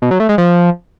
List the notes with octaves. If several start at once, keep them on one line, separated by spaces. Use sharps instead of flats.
B2
F#3
A3
G#3
F3